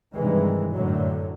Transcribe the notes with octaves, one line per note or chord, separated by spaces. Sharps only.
G2 C3 D#3 E3 G3 G#3
F#2 A2 D3 F#3